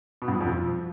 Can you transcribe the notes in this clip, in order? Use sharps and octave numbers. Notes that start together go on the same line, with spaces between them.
B2
G2
F3
F2
F3